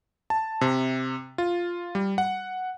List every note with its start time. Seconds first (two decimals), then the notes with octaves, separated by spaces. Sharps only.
0.30 A5
0.61 C3
1.38 F4
1.95 G3
2.18 F#5